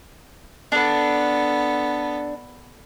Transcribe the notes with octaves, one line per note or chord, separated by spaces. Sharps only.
B3 D4 A4